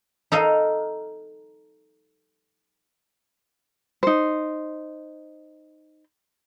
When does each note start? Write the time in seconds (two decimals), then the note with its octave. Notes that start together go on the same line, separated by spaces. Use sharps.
0.32 D#4 A4 D#5 F5
4.03 D#4 C5